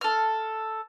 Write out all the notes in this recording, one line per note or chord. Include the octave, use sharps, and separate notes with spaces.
A4 F6